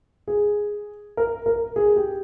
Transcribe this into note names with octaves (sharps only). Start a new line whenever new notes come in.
G#4
A#4
A#4
G#4
G4